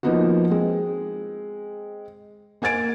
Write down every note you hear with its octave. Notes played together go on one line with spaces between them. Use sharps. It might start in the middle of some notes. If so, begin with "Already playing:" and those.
F3 A#3 B3 D#4 F4 F#4
G#3 C4
A#3 G#5 G#6 A6 D7